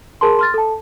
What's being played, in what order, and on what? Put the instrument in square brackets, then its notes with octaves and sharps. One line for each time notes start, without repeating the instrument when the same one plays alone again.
[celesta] G#4 A#4 A5 C6
C6 F6 A6
A4 A5